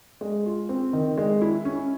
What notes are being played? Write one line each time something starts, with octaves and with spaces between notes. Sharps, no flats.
G#3
F4
C4
D#3
G#3
E4
C#4